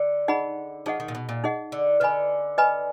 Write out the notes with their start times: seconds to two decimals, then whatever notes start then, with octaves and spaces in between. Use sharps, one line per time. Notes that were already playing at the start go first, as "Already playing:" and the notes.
Already playing: D3
0.28 D#4 G#4 D#5 F#5 B5
0.86 F3 D#4 G#4 D#5 F#5
1.00 D#3
1.08 A#2
1.15 B2
1.29 A#2
1.44 D#4 G#4 D#5 F#5
1.72 D3
2.00 D3 B4 D#5 G#5 B5
2.58 B4 D#5 G#5 B5